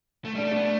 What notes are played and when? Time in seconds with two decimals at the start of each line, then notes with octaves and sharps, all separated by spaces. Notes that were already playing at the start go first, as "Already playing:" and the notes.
0.25 A3
0.35 G3
0.38 D4
0.44 A3
0.51 B3 D4
0.65 A3